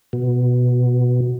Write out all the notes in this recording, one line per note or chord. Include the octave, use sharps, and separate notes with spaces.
B2